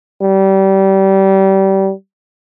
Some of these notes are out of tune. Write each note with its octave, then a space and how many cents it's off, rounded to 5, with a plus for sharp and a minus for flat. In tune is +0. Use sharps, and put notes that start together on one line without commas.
G3 -25